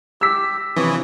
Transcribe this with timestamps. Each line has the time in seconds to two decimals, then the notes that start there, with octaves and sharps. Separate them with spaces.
0.21 G4 E6 B6
0.57 A#6
0.77 C3 E3 F3 C4 D4 C#5 D#6